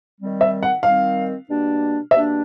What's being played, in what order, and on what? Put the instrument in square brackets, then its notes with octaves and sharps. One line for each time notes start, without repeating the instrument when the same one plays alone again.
[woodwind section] D#3 G3 C4
[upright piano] E5
F#5
[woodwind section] D#3 G3 C4 [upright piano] F5
[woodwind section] B2 G3 A#3 D4
[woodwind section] B2 G3 A#3 D4 [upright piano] E5